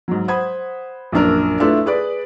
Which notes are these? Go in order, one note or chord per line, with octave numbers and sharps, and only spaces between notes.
G#2 F#3
C5 F#5 B5 D#6 G#6
A#1 F#2 D4 A#4
A3 D4 E4 F4 A4 B4
G#4 B4 D5